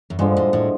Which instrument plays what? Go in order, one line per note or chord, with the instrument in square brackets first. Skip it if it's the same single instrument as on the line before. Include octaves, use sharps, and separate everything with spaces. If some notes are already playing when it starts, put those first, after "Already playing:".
[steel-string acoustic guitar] F#2
[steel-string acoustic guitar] G2 [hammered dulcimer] D3 F3 G#3
[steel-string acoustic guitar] A2
A2